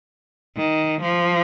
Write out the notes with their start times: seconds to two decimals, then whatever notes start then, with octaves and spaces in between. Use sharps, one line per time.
0.57 D#3
1.02 F3